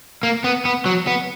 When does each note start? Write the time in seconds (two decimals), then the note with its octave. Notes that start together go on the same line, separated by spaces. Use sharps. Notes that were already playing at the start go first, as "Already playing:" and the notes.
0.23 A#3
0.44 B3
0.65 B3
0.86 F#3
1.07 B3